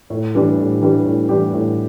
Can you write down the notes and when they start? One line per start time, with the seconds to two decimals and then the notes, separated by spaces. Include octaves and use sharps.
0.10 A2
0.34 E3 G3 D4 G4
0.58 A2
0.81 E3 G3 D4 G4
1.06 A2
1.29 E3 G3 D4 G4
1.53 A2